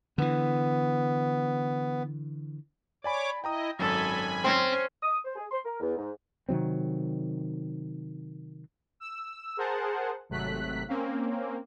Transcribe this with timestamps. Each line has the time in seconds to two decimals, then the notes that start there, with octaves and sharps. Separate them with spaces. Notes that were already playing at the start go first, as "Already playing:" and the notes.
0.18 D3 E3 B3
3.04 C#5 D5 G#5 B5 D6
3.44 E4 D#5 G5 A#5 D#6
3.79 G#1 F#2 F#3 A4 G#5 B5
4.44 C4 C#4
5.03 D#6
5.24 C5
5.35 G#4
5.51 C6
5.65 A#4
5.80 E2
5.97 G#2
6.49 C3 D#3 F#3 C4
9.00 E6
9.57 G#4 A#4 C5 F#5 A5
10.29 G#1 C3 F#3 A3 F#6 B6
10.88 A#3 C4 C#4